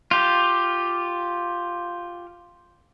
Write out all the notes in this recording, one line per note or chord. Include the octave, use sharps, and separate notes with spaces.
F4 G4